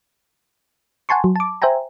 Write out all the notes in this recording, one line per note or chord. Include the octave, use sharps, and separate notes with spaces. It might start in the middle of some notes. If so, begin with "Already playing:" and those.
F#5 G#5 A5 C6 C#6
F#3
A5 D6
C5 E5 G5 G#5 A#5